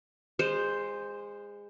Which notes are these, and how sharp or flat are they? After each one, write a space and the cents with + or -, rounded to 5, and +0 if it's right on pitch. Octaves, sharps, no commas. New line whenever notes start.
G#3 -25 C5 +0